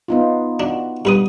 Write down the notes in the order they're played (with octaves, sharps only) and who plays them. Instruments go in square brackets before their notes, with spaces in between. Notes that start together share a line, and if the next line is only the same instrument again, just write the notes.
[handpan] B3 D#4 F4
[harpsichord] D4 [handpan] F#4
[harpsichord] G2 B4 D#6